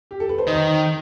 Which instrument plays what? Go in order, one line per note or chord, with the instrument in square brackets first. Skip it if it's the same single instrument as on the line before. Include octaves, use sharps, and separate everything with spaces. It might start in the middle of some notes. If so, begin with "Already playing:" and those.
[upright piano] G4
A4
B4
C5
[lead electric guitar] D#3 [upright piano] D#5